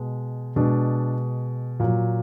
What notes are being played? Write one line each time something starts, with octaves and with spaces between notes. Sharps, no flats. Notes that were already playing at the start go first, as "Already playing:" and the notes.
Already playing: B2 G#3
B2 G#3 D4
A#2 F#3